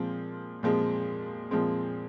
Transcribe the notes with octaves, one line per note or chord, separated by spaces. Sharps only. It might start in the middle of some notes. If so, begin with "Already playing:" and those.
Already playing: A#2 F3 G#3 C4
A#2 F3 G#3 C4
A#2 F3 G#3 C4